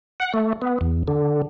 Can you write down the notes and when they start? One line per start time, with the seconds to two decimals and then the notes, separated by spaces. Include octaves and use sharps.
0.20 F#5
0.34 A3
0.62 B3
0.81 E2
1.08 D3